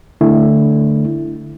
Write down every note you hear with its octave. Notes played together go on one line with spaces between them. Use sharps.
D3 A3 D4 E4